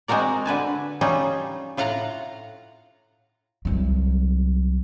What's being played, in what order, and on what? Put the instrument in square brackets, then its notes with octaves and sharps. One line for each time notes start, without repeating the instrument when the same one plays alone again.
[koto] G#3 C4 F#4 A#4 D5
D3 B4 G#5 A5
G3 C#4 D#4 F4
A2 F4 F5 F#5 A#5
[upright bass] C2 F#3